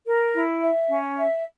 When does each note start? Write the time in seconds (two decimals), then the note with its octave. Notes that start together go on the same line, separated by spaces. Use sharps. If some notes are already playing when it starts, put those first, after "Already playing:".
0.06 A#4
0.33 E4
0.61 E5
0.89 C#4
1.17 E5